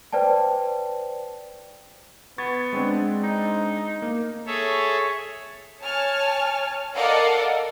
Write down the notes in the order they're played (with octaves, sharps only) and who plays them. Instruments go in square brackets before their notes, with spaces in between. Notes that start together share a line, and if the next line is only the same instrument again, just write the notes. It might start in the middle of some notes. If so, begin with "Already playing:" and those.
[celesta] B4 C5 D5 G5 A5
[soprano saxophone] B3 [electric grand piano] C#6 G#6 A6
[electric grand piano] G#3 C4 D4
[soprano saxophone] D#4
[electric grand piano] A#3
[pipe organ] G#4 A4 C#5 E5
[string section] C#5 G#5 A5 F6
A4 A#4 D5 D#5 F5 F#5